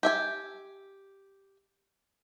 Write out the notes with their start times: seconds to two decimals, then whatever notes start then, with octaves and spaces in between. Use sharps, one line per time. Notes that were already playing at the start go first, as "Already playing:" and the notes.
0.03 G4 E5 G#5